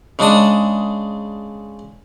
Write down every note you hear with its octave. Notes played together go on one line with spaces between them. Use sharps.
C#3 G#3 D4 A5 D#6